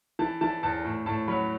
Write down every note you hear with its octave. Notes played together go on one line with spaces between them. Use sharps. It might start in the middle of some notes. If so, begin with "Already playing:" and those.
E3 A5
E3 A5
E2 A5
A2
A2 A5
F#3 B5